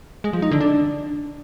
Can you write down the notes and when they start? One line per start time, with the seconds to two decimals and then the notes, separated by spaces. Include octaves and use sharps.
0.24 G#3
0.33 F3
0.42 D#4
0.51 D3
0.61 D4